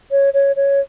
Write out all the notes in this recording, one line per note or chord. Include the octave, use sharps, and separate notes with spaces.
C#5
C#5
C#5